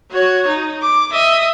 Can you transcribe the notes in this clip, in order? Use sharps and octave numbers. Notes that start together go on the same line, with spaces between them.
F#4 C#5
D#4
D6
D#5 E5